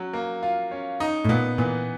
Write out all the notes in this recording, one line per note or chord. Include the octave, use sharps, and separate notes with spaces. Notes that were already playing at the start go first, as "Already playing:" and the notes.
Already playing: F#3 C#4
A#3
F4
C#4
D#4
A2
A#2 B3
A#2 E3